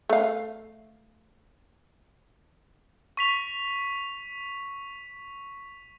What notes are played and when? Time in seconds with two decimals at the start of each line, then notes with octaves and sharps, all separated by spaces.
0.09 A3 F5
3.17 C#6 B6 F7